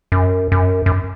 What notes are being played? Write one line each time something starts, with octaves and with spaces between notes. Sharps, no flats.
F#2
F#2
F#2